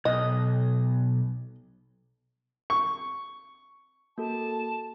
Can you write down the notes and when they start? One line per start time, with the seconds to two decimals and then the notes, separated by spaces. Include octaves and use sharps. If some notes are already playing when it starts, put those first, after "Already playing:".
0.05 B1 D#5
2.70 C#6
4.18 A#3 F#4 A4 A5